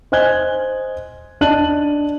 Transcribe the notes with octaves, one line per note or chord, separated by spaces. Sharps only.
C5 D#5 G#5 F#6 G#6 G7
D4 D#5 A5 F#6 D#7 F#7